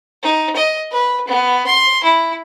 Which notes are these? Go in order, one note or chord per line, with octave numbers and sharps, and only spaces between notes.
D#4
D#5
B4
B3
C6
E4